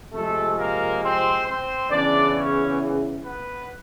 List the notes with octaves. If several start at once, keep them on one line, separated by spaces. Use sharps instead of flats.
C3 F3 G#3 A3 A4
A#3 A#4
C4 C5
C4 C5
E2 C#3 E3 D4 D5
C#4 C#5
B3 B4